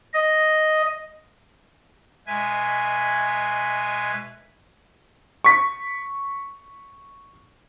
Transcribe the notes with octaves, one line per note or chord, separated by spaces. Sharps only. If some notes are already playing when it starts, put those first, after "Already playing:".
D#5
B2 G#3 B4 E5 G#5 G#6
C#6 B6